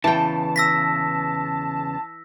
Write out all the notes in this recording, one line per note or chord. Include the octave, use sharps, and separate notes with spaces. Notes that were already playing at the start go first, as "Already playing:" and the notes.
E2 C#3 E3 G5 A5
E6 A#6 B6